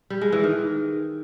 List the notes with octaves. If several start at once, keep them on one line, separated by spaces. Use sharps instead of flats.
G3
G#3
E3
D#3